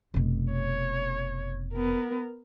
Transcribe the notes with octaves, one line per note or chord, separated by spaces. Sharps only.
F1 B2
C#5
B3 A#4